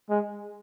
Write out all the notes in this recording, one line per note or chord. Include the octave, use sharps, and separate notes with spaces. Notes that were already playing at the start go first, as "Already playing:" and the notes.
G#3